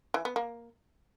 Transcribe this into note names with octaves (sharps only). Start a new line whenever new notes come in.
E3
B3
A#3